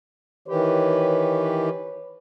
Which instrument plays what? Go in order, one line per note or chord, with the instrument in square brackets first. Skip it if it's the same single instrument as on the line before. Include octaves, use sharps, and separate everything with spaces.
[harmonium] D#3 E3 G4 [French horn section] B4 C#5